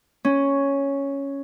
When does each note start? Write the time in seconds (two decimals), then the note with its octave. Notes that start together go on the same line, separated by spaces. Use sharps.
0.25 C#4